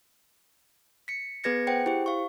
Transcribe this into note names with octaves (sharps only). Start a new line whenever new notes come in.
B6 C#7
B3 G#4 B4 G#6 A#6 C#7
G#4 C5 F#5 G5 C#7
E4 G4 C5
F5 C#6